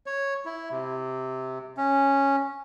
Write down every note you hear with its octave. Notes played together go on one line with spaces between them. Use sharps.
C#5
E4
C3
C#4